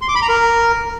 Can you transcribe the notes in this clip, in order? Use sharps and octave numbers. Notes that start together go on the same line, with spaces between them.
C6
D6
B5
A#5
A#4